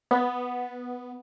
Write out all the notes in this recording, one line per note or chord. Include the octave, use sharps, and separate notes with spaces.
B3